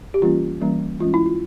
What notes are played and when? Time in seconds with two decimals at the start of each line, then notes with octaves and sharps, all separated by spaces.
0.14 G4
0.22 E3 G3 A#3 C#4 F4
0.61 E3 G3 A#3 C#4
0.99 E3 G#3 C#4 F4
1.14 E4
1.26 F4